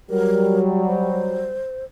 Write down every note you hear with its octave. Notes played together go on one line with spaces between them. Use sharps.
F#3 G3 A#4
C5